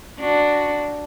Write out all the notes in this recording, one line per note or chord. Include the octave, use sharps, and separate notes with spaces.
D4 F#4